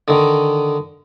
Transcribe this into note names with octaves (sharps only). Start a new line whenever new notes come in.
D3 D#3